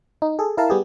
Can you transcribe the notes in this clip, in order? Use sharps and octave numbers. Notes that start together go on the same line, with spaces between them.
D#4
G#4 A4
E4 A#4 F5 A5
G3 B3 G4 G#4